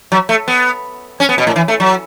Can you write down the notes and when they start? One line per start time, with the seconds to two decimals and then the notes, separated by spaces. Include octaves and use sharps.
0.12 F#3
0.29 A3
0.48 B3
1.20 C#4
1.29 B3
1.38 B2
1.47 A2
1.56 E3
1.68 A3
1.80 F#3